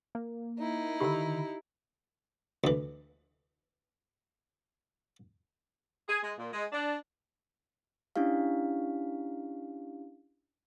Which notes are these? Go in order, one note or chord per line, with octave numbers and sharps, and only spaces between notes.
A#3
D#4 E4
D3 D#3 G4 B5 E6
D2 E3
G#4
G#3
A#2
G#3
D4
C#4 D4 E4 G4 F5